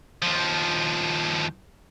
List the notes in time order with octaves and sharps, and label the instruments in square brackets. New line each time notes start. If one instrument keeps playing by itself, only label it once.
[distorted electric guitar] D#2 F3